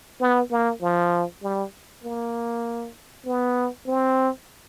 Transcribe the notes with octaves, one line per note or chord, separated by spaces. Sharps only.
B3
A#3
F3
G3
A#3
B3
C4